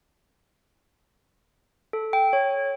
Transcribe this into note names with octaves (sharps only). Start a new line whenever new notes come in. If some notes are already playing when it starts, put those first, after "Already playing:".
A4
G5
C#5